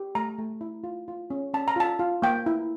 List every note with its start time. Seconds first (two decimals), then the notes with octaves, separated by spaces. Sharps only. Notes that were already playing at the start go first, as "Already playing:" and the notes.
Already playing: G4
0.15 A3 A#5
0.38 A3
0.61 E4
0.84 F4
1.08 F4
1.30 C#4
1.54 C#4 A5
1.68 A#5
1.76 F4 A5
1.99 F4
2.22 A#3 G5
2.46 E4